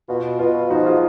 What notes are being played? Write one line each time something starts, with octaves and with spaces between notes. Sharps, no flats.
B2 F4
B2 F4
F3 D#4 F#4
F4 G#4